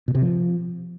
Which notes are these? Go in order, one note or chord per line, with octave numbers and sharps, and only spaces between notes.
B2
C3
F3